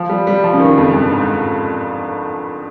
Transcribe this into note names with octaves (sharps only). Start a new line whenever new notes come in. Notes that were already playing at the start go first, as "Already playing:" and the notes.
Already playing: F3
G3
G3
F3
C#3
D#3
F2
G2
G#2